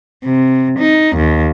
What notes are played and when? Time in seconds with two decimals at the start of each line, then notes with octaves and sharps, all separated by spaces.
0.24 C3
0.79 D#4
1.16 D#2